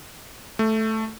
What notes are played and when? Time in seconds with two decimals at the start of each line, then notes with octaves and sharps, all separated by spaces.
0.59 A3